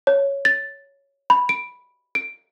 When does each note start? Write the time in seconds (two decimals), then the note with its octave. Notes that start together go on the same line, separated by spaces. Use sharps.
0.07 C#5
0.45 A6
1.30 B5
1.49 D7
2.15 D7